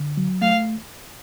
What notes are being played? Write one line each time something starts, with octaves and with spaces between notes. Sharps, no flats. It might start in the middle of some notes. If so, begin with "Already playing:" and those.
Already playing: D3
F#3
A3 F5